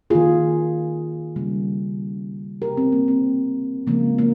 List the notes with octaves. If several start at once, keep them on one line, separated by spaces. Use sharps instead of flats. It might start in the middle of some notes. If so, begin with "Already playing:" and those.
D#3 A#3 F4 G#4
C#3 G3 A#3
C3 D#3 G3 A#3 G4 A#4
C4
A#3
C4
C#3 F3 G#3 A#3
A#3